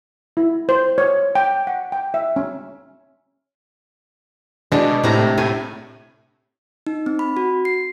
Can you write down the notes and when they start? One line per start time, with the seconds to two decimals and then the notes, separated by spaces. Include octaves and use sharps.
0.37 E4
0.69 C5
0.98 C#5
1.35 G5
1.67 F#5
1.92 G5
2.14 E5
2.36 C#4
4.72 B2 G#3 D4
5.04 A2 C3 A#5
5.38 A2 G#5
6.87 D#4
7.06 C4
7.19 B5
7.37 F#4
7.65 C7